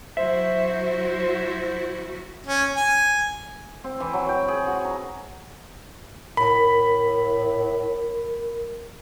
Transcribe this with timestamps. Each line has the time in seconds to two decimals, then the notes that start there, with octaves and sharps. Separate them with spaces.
0.17 F#3 E4 F#4 C5 E5
2.47 C#4
2.76 G#5
3.84 C4
4.00 E3
4.13 F#3
4.29 G5
4.48 G#4
4.67 F#4
4.85 A#5
6.37 A2 A#4 B5